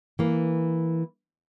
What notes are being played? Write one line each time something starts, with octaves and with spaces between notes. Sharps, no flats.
E3 A#3